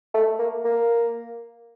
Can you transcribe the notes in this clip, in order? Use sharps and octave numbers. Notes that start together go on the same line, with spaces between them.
A3
A#3
A#3